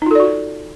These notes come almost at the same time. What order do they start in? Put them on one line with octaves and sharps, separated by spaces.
D#4 F4 A4 D5 F#4